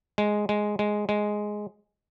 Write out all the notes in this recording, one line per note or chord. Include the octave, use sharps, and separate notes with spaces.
G#3
G#3
G#3
G#3